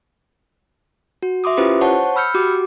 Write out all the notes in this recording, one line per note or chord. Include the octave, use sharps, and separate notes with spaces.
F#4
E5 C6 D6 D#6
C#4 E4 F4 G4 B4 C5
C5 C#5 F#5 A5 C#6
B5 E6 F6 G6 C#7
F#4 G4 D6